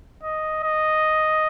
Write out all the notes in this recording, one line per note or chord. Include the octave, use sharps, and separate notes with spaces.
D#5
D#5